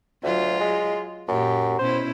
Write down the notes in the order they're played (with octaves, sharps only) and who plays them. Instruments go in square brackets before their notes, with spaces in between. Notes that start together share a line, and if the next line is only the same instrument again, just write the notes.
[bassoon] D2 [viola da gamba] F#3 F4
[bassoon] G#3
[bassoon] F#2 [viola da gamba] A#2 G4
[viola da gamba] B2 C#4 E4 [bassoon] C5